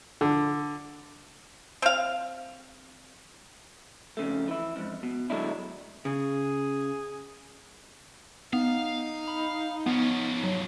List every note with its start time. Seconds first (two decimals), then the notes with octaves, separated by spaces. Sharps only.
0.21 D3
1.82 C4 F5
4.17 F2 C#3 A3
4.48 E3 E4
4.76 F2 G#2
5.03 B2
5.30 D3 F#3 G#3 A3 D4 E4
6.05 C#3 G#4
8.53 B3 D#4 F5
9.28 B5
9.86 F3 B3 C#4
10.44 F#3